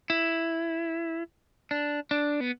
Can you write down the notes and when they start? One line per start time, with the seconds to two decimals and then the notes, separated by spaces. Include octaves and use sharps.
0.10 E4
1.71 D4
2.11 D4
2.40 B3